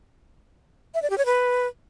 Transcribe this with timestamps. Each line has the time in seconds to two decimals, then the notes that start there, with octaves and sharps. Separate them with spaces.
0.94 E5
1.02 D5
1.10 G4
1.18 C#5
1.26 B4